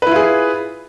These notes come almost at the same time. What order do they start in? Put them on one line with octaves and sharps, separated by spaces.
B4 E4 F4 G#4